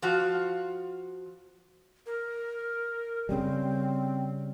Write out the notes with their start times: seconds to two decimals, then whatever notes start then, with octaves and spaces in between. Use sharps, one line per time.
0.02 F3 F4 F#4
2.06 A#4
3.29 C#3 G3 C4